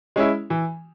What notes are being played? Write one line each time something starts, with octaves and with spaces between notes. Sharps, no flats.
G#3 C#4 E4
E3